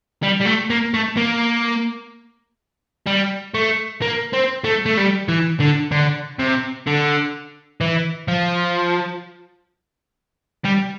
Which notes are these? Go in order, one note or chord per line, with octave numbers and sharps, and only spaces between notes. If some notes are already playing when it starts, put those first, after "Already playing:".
G3
G3
A3
A#3
A3
A#3
G3
A3
A#3
C4
A3
A3
G3
E3
D3
D3
C3
D3
E3
F3
G3